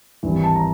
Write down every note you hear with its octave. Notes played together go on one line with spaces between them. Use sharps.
G#1 G2 E3
A5
A#5